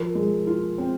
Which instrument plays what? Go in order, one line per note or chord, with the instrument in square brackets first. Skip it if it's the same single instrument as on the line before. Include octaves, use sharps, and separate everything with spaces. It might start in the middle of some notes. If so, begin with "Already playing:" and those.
Already playing: [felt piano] F3 [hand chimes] A#4
[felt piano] G#3
F4
C4